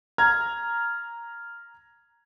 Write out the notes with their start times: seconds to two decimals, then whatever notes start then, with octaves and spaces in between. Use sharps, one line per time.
0.18 A#5 F6 G#6